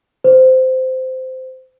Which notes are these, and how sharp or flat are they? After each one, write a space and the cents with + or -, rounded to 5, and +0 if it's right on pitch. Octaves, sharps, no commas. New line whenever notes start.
C5 -15